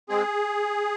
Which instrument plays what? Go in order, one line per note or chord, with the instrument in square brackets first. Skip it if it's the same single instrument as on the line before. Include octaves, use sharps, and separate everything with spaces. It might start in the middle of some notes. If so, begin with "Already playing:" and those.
[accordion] G#3 C4 G#4